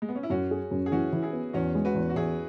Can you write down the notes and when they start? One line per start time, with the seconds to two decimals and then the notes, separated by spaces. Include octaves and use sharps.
0.02 G#3
0.08 B3
0.15 C#4
0.23 E4
0.30 F#2 C#4 F#4
0.51 G#4
0.71 F#2
0.86 G#4
0.91 E3 C#4 F#4
1.13 E3
1.22 E4 G#4
1.33 B3
1.53 E2 C#4 F#4
1.75 G#3
1.85 F#4 B4
1.94 E2
2.10 F#4
2.16 E2 E4 G#4